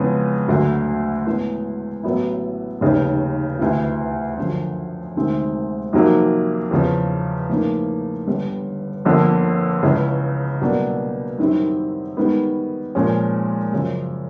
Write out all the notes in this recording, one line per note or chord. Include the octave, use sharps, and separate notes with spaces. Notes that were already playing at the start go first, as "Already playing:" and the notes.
Already playing: F2 C#3 E3 G#3 B3
D2 D3 F#3 A3
A2 E3 G#3 B3
A1 A2 F#3 B3 E4
F1 D#2 C#3
D2 C3 E3
F#2 D3 F3
D2 C3 D#3 G#3 C4
F2 C3 D#3 F#3 A#3
E2 C#3 F3
A2 F3 A#3 D#4
G1 G2 D3 G3
G1 F2 D3 F3 A#3
C#2 C#3 E3
C2 B2 F#3 A#3 D4
F#2 D#3 G3 C4 E4
G#2 D#3 G3 B3
A#2 F3 G#3 C#4
F#2 C#3 F3